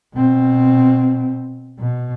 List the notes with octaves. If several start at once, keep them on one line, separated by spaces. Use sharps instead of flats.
B2 C4
B2